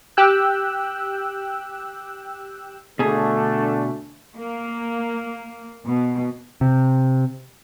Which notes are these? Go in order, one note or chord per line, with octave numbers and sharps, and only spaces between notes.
G4 G5 E6 F#6
B2 D3 A3 D4 G#4
A#3
B2
C3